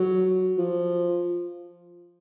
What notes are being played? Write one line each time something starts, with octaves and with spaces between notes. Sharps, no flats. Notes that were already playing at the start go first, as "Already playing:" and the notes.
Already playing: F#3
F3